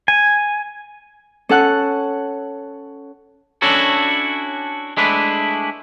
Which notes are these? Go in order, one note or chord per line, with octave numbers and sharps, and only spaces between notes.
G#5
C#4 A4 F#5 F#6
C#4 D4 E4 F#4 A4 C#5
G#3 A3 D4 E4 B4